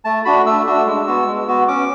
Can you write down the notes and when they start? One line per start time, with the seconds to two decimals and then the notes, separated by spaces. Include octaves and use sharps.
0.05 A3 A5
0.25 D4 F#4 B5
0.46 A3 E6
0.66 D4 F#4
0.86 G#3
1.07 B3 F#4
1.27 G#3
1.47 B3 F#4
1.68 C#4 D6